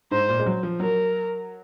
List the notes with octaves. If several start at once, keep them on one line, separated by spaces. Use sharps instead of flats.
G#2 C5
A#2
G#3
F#3
F3
F#3 A#4